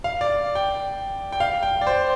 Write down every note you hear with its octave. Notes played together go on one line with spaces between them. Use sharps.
F5
D5
G5
G5
F5
G5
D5
C5